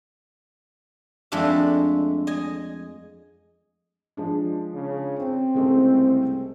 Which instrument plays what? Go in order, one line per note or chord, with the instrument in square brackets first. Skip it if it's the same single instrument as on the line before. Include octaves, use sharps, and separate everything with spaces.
[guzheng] F2 G#3 A3 D4 E5
D#5 G#5
[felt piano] F3 G#3 D4
[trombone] C#3
C4
[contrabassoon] C2 [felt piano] C#3 G#3 A3